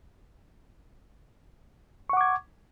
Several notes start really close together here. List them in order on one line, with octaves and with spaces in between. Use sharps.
C#6 F#5 D6 G#6